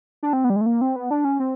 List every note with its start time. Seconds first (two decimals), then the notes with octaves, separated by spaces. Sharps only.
0.23 D4
0.33 C4
0.44 B3
0.50 G3
0.56 G#3
0.61 A3
0.66 A#3
0.81 C4
0.96 B3
1.11 D4
1.25 C#4
1.40 C4